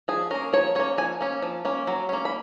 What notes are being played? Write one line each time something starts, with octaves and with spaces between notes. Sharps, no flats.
F3 G#4
A#3 C#4 A#4
F3 C#5
A#3 C#4 C#5
F3 G#5
A#3 C#4
F3
A#3 C#4
F#3
A#3 C#4
B5